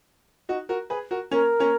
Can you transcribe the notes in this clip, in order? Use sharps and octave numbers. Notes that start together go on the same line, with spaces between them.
D#4 F#4
F#4 A#4
G#4 B4
F#4 A#4
A#3 C#4 A#4
A#3 C#4